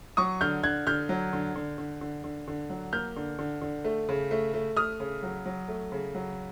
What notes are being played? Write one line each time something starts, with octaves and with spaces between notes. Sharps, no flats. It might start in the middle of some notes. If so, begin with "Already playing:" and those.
F#3 C#6 D#6
D3 F6 G6
D3 F#6 G#6
D3 F6 G6
F#3
D3
D3
D3
D3
D3
D3
F#3
A#3 F6 G6
D3
D3
D3
A3
C#3
A3
A3
A3 D#6 F6
C#3
F#3
F#3
A3
C#3
F#3